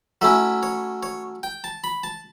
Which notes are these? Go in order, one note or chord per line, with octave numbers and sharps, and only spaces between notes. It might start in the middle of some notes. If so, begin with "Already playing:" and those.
F#3 A3 C#4 E4 E5
C#5
C#5
G5
A5
B5
A5